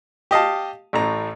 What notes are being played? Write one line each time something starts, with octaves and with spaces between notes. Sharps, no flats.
G4 D#5 F5 A5
A1 A2 A#5